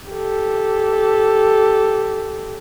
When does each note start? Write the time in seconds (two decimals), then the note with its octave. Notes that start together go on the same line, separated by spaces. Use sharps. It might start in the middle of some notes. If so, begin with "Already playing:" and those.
0.11 G4 A4